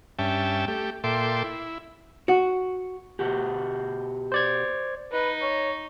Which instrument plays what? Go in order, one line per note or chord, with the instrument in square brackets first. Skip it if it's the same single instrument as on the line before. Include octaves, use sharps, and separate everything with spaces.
[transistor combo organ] G2 C#4 E5 G5 A5
A3 G4
A#2 A4 E5 G5 C6 D6
E4
[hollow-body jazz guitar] F#4
[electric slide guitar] B2 F#4 G4
[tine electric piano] C5 D5 G#6
[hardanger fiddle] D#4 [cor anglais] B4
[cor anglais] C#5